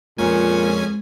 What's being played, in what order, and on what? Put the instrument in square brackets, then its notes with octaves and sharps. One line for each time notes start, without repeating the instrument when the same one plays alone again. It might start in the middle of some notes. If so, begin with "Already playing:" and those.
[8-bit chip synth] F2 C#4 G#5 [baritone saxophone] A#2 [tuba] G#3